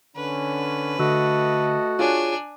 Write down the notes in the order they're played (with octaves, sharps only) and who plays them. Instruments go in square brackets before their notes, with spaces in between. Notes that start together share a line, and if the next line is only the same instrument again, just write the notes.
[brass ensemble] D3 C#4 [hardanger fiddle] B4
[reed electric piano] D3 E6 [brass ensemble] A3 A4 D#5 [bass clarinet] F#4
[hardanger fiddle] D4 G#5 [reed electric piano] F4 G#4 C#5